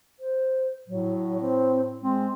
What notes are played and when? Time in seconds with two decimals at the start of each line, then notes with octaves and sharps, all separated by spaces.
0.20 C5
0.88 A2 F#3
1.40 C4
2.01 G#3 C4